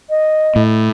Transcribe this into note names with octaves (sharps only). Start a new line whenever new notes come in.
D#5
A2